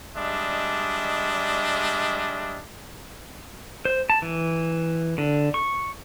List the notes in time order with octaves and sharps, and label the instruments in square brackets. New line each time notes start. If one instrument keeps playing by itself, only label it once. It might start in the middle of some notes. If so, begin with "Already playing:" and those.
[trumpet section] G3 G#3 D4 D#5 E5
[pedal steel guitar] C5
A5
E3
D3
C#6